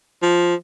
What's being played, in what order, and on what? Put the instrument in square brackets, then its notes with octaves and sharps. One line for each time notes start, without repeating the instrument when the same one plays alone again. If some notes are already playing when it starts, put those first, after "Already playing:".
[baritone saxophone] F3